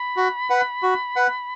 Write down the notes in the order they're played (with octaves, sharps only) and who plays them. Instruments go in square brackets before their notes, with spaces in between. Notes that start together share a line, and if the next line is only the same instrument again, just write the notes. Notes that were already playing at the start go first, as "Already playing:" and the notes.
Already playing: [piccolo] B5
[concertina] F#4
B4 F#5
F#4
B4 F#5